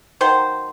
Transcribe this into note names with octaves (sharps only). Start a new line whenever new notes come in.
D#3 F#3 C5